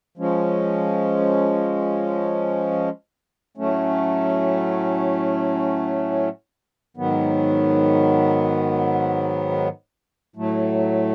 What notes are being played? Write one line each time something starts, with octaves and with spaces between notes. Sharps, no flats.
F3 G#3 C#4
A2 F#3 A3 C#4
G#2 D#3 F#3 B3
A2 F#3 A3